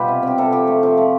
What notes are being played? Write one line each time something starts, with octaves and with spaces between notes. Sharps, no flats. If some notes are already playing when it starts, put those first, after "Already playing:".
Already playing: B2 G3 F4 G4 B4
C3
C4 G4
C3 A4
F3 G4
A3
F3
A3